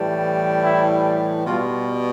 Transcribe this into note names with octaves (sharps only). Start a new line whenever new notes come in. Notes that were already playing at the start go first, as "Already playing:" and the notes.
Already playing: A2 E3 G3
E4
B2 G3 F4